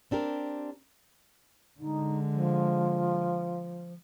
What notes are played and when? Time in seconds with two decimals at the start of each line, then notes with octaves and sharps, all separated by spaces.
0.11 C4 D4 G4 A#4
1.80 D3 G#3 D#4
2.32 F3